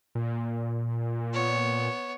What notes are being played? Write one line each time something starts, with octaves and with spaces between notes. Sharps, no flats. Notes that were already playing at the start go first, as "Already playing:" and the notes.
A#2
B3 C#5